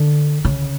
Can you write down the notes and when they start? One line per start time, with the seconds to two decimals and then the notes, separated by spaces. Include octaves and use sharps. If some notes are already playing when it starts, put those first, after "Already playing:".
Already playing: D3
0.45 C#3